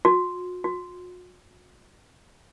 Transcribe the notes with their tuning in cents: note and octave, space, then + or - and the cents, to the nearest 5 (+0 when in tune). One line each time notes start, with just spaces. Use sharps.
F#4 -40
F#4 -45